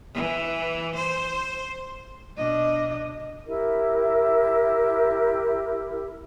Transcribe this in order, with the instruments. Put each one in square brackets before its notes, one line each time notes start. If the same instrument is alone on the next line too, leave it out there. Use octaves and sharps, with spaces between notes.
[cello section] E3
C5
[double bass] B2 D4 [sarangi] D#5
[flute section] E4 G4 A#4 E5